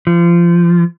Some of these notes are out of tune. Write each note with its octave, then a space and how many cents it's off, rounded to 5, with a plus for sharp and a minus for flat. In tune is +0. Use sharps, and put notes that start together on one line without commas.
F3 -25